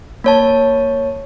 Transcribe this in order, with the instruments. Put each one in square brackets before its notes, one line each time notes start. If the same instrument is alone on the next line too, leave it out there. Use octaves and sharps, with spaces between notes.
[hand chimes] A#3 C#5 A5